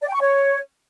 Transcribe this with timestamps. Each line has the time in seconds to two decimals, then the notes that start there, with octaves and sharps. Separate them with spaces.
0.01 D5
0.08 G5
0.14 C#6
0.20 C#5